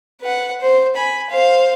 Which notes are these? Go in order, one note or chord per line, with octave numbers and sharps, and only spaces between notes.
B4 F#5
C5
G#5 B5
C5 F5